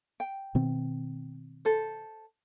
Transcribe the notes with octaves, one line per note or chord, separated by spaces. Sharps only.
G5
B2 D#3 C4
A4 C5